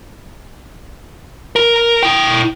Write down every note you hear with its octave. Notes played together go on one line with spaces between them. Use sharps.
A#4
E4 G5